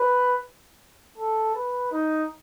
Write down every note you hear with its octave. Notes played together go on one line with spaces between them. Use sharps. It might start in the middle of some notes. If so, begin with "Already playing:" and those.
Already playing: B4
A4
B4
D#4